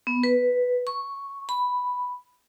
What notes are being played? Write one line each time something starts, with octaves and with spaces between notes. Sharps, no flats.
B3
B4
C#6
B5